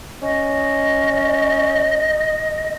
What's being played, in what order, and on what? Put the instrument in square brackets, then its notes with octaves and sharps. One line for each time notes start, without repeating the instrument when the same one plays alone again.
[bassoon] C#4 [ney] D#5